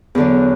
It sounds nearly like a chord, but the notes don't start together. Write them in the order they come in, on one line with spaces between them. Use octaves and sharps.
E2 D3 F#3